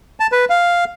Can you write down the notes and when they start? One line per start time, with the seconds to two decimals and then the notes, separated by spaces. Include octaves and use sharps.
0.20 A5
0.32 B4
0.50 F5